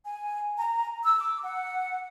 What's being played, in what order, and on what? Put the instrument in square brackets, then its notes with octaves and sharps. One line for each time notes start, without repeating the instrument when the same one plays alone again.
[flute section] G#5
A#5
E6
D6
F#5